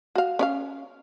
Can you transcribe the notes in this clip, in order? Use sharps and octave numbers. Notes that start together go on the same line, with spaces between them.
F#4 F5
C#4 D5 F5